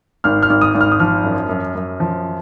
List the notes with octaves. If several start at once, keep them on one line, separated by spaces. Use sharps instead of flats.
G#1 F6
F6
G#1
D#6
G#1
F6
D#6
F3 F6
F#2
F#2
F#2
F3